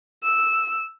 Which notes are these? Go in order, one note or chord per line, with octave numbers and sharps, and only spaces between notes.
E6